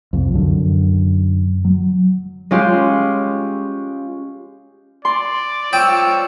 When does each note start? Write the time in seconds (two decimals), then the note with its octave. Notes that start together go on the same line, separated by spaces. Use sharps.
0.13 C2 F2
0.34 F#2 D3
1.65 F#3
2.51 G#3 C#4 F4 G4
5.05 D5 C6
5.73 F3 C#5 G5 E6